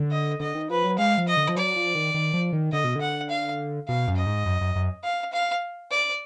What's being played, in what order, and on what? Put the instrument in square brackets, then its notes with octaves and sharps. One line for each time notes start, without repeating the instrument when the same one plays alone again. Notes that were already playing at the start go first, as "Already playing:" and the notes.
Already playing: [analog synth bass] D3
[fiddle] D#5
[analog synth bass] D3 [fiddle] D#5
[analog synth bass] D#3
[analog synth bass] F3 [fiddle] B4
[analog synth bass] F#3
[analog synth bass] G#3 [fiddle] F5
[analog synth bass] F3
[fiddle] D#5
[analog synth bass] D3
F3
[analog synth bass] F#3 [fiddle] D5
[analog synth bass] F3
D#3
D#3
F3
D#3
[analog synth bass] D3 [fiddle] D#5
[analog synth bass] B2
D3
[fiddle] F#5
F5
[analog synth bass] B2 [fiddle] F5
[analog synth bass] F#2
[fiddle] D#5
[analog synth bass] G#2
F#2
F#2
F#2
[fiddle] F5
F5
D5